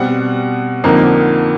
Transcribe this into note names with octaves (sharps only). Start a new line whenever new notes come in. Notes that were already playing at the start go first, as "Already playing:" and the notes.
Already playing: B2 G3 C4 F#5
F2 D3 F3 A#3 D#4